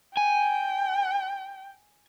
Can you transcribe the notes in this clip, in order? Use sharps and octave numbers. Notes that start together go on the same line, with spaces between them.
G5 G#5